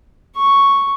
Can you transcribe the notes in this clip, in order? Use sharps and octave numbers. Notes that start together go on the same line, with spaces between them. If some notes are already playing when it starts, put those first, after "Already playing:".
C#6